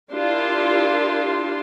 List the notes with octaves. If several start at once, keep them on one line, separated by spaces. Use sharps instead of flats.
D4 E4 F4 G4 A#4 C6